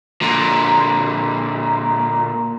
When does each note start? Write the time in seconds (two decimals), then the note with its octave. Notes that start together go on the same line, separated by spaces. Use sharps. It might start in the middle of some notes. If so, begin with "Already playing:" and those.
0.22 A#2 D3